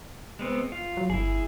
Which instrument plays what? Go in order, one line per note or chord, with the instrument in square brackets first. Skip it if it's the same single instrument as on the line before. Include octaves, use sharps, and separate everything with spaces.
[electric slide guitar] G#3 B3 C4
F4
[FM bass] F#3
[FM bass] G1 [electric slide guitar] E4 G#4